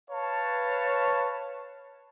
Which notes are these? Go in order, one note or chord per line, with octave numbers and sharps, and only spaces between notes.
B4 C#5 F5 A5